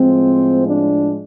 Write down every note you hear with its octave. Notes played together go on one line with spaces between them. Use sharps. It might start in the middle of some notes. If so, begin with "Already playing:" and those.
Already playing: A2 F3 G#3 C4
D4